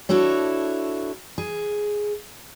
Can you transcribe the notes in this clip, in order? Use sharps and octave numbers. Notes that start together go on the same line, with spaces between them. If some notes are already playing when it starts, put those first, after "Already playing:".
D4 E4 F#4 A4 C#5
G#4